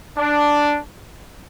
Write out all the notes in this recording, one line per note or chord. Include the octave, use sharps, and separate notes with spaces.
D4